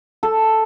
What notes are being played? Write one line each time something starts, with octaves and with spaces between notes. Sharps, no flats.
A4